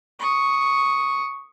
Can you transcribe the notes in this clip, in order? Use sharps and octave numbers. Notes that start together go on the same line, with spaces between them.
C#6 D#6